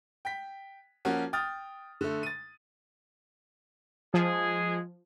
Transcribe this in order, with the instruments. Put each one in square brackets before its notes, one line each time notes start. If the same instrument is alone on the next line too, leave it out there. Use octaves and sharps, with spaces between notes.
[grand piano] G5 B6
F3 A#3 C#4 F#4
G5 D#6 F6 A6
D3 A3
A6 D#7
[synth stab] F3 [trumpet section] G#3 G#4